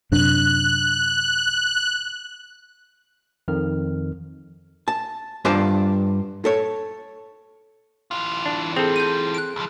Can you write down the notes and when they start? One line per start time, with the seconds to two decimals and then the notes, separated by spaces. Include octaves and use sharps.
0.12 F#2 C3 D4 F#6
3.48 F2 D#3 F6
4.88 A5
5.45 G2 F4 C5 D5 F5 A5
6.45 A4 C#5
8.11 E3 F4
8.46 D4
8.76 C4 G#4 A4
8.96 G6 D#7
9.35 F#6 D7
9.56 C#2 F3